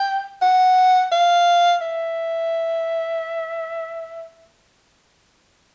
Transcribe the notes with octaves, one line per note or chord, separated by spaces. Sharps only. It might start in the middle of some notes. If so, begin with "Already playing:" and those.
Already playing: G5
F#5
F5
E5